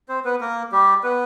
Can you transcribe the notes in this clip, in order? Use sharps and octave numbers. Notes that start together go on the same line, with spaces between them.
C4 C5
B3 B4
A#3 A#4
G3 G4
B3 B4